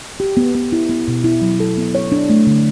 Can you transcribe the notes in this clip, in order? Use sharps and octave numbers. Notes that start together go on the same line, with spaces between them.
G4
B3
B3
E4
B3
B2
E4
F#3
A4
B3
C#5
D4
A3
D3